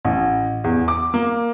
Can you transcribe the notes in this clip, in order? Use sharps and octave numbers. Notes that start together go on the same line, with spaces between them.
A1
E2
D6
A#3